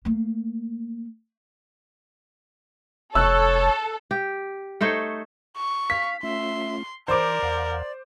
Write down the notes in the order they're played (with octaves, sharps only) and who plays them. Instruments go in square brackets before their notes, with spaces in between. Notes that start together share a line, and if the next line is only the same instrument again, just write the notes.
[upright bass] A3 A#3
[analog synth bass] F1 [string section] A4 [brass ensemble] C#5 [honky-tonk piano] E6 F#6
[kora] G4
A3 D#4 C5 C#5
[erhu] C#6
[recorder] F5 [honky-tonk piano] B6
[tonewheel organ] A3 C#4 F4 [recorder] E5 [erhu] C6
[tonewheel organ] E3 [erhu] A#4 [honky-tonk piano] C5 D6 [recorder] D5
[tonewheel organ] E2 F5 F#5